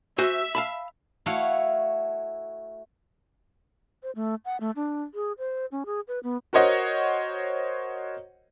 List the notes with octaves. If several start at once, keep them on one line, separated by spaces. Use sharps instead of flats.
F#4 C5 E5 G#5
F5 A5 B5
A3 E4 F#4 C#5 F5
C5
A3
F#5
A3
D4
G#4
C5
C#4
G#4
B4
B3
F#4 A#4 C5 C#5 D#5 F#5